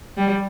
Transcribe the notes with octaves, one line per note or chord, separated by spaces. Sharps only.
G3